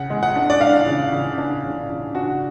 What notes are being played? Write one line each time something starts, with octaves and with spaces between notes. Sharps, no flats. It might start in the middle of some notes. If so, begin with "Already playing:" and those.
Already playing: C#3 F#5
G#3
F#5
D4
D5
D4 F5
C#3
C#3
D4
C#3
C#3
D4 F#4